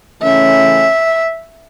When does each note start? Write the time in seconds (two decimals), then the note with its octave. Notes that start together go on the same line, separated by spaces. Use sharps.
0.22 C#3 E3 A3 C#4 E5